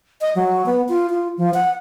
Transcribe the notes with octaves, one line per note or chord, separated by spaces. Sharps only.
D#5
F#3
B3
F4
F4
F3
F#5